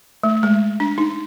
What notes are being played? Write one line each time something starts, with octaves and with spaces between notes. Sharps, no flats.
A3
G#3
D4
D#4